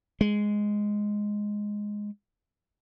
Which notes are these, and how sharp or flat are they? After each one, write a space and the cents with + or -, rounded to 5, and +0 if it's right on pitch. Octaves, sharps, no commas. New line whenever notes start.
G#3 +0